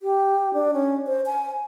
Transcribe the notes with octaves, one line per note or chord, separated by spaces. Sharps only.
G4
D4
C#4
C5
G#5